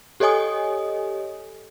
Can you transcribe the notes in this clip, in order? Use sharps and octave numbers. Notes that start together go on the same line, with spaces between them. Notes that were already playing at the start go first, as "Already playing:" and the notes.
G4 A4 C#5 D#5 G#5 D#6